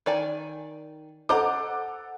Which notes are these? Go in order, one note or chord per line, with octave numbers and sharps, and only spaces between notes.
D#3 D5 G#5
A4 C5 D#5 F#5 A#5 D6